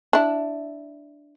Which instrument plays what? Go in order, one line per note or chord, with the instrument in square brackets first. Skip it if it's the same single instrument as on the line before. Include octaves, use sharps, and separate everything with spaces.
[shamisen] D4 E4